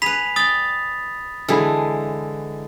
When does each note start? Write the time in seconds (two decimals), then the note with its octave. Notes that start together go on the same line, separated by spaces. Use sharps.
0.02 G#4 B4 B5 B6 F7
0.36 D5 G5 D#6 A6
1.48 D3 E3 G#3 E4 G#4 A4